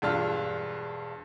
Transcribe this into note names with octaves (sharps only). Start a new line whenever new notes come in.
E1 G2 D4 F4 F6